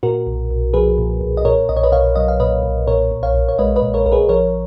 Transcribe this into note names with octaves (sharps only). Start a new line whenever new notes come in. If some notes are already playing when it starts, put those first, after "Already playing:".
A#2 F#4 A#4
B1
B1
F3 G#4 B4
A#2
B1
D#5
A#2 A#4 C#5
B1 D#5
C#5
B4 D#5
B1 C#5 F5
F#3 D#5
F5
A#2 B4 D#5
B1
A#2 A#4 C#5
A#1
C#5 F5
A#1
C#5
G#3 B4 D#5
B4 D#5
A#2
A#4 C#5
A#1 A#4
G#4 B4
F3 A#4 C#5